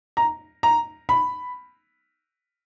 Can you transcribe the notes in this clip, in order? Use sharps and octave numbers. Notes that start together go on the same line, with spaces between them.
A#5
A#5
B5